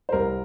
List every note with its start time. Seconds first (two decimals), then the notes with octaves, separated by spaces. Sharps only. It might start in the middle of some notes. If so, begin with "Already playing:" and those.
0.09 C5
0.12 C2 A#4